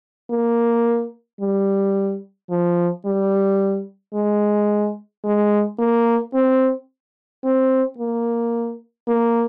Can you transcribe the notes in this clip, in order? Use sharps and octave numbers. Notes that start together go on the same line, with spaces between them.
A#3
G3
F3
G3
G#3
G#3
A#3
C4
C4
A#3
A#3